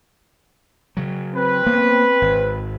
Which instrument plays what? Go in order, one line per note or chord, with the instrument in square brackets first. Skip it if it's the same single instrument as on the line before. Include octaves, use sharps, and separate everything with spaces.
[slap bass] C#3 F#3
[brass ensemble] C4 B4
[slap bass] A#3 B3
G#1